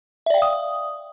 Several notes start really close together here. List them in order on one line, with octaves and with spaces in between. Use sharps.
E5 D5 G5 F5 D#6